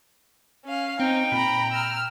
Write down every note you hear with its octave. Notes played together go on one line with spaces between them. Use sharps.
C#4 F5
C4 D#4 G5
A#2 A#5 B5
E6 F6